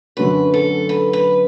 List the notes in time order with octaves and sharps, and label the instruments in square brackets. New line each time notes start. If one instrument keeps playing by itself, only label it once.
[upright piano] F#2 D3 A3 C#4 F#4 [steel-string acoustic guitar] B4
[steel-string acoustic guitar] A4
B4
B4